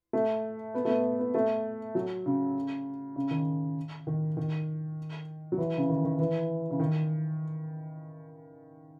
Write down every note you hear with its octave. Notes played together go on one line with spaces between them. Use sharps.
A3
B3
A3
B3
B3
A3
F#3
C#3
C#3
D#3
D#3
D#3
F#3
E3
C#3
D#3
D#3
E3
C#3
D#3